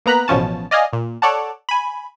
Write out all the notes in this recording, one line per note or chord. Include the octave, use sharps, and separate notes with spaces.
A#3 B3 A#5 F#6 B6
A1 B2 F3 C#4 A5
D5 D#5 F5 G#5
A#2
A4 C#5 D5 F#5 A5
G#5 B5